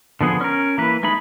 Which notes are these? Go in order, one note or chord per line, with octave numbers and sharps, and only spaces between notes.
D3 F3 B3 G#4
C#4 A#4
E3 A#3 B4
G#3 A3 D#4 B5